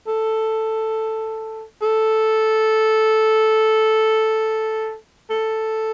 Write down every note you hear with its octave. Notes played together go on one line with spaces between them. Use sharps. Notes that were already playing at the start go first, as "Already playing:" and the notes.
A4
A4
A4